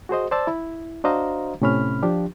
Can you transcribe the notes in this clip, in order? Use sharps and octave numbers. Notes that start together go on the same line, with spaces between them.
F#4 G#4 C5 D#5
C5 D5 A5 E6 A6
E4
D4 F#4 C5 D#5 F5 A#5
A2 C3 C#4 B5 F6
F3 D4 F4 G4